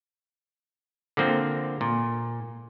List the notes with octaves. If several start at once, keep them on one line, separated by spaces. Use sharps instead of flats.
D3 F3 A#3 C4
A#2